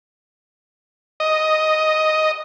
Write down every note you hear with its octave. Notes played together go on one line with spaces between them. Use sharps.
D#5